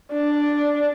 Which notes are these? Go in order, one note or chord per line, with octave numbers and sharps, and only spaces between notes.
D4